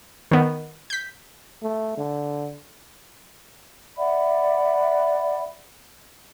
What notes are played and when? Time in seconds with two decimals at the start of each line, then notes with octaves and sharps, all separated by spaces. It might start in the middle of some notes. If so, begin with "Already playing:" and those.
0.31 D#3 B3
0.90 G6 B6
1.62 A3
1.98 D3
3.97 D5 E5 F#5 B5